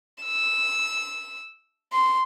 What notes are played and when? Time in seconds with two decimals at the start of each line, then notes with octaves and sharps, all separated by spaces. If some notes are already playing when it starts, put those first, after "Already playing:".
0.23 E6
1.93 C6